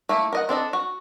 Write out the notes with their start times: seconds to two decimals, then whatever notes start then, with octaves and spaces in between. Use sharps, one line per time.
0.09 A3 A#3 E4
0.33 A#4 D#5 F#5
0.49 C4 D4 A4 D#5
0.73 F#4